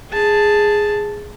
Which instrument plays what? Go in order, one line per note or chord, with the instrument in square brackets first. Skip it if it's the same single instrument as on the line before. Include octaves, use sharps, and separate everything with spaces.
[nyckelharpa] G#4 A5